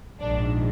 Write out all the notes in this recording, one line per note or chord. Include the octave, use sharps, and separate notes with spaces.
A#1 G#2 D#3 D4